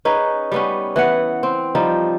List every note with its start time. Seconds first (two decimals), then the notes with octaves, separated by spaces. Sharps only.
0.05 C#4 D#4 G#4 B4
0.52 G3 B3 C#4
0.96 E3 B3 F#5
1.43 C4
1.75 F3 G3 D#4